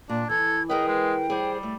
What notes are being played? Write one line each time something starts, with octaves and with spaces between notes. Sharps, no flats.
A#2 D4
E3 A4 G#6
G#4 A#4 B4 D#5 G5
G#3
G3 G#4 C5
A3